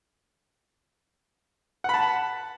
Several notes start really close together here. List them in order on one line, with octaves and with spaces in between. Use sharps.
F#5 B5 A5